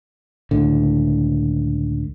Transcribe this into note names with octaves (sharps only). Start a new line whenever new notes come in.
C#2 A2 D3